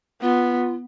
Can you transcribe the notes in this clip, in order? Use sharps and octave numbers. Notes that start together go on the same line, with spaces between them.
B3 F4